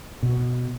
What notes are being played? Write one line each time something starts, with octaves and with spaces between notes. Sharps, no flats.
B2